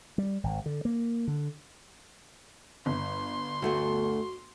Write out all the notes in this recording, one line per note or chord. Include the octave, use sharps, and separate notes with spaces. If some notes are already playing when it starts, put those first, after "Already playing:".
G3
G#1
D3
A#3
D3
G1 C6
D2 A3 B3 F#4